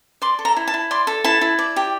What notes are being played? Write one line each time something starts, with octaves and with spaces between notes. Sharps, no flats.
D5 C6
A4
A#5
E4
A5
E4
D5 C6
A4
E4 A5
E4
D5
G4